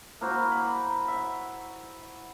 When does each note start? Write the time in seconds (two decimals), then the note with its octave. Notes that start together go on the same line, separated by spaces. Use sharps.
0.21 A#3 E4 F#4 C5
0.52 B5
1.08 E5